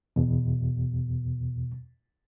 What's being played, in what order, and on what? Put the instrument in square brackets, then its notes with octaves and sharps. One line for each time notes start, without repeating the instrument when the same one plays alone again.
[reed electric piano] E2 B2